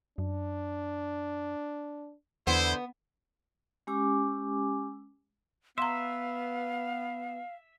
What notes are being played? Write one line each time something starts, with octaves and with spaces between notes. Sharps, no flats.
F#2 D4
E2 D3 B3 E4 C5
G#3 C#4 G4 G#5 D6 E6
B3 E5 F5 A#5 C6